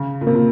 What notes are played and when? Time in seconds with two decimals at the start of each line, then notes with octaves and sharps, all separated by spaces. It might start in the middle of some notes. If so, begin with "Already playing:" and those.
Already playing: C#3
0.21 A#2
0.27 C3 A#3
0.35 A#2